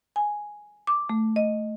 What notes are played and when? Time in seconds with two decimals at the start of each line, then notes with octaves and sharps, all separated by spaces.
0.16 G#5
0.87 D6
1.09 A3
1.36 D#5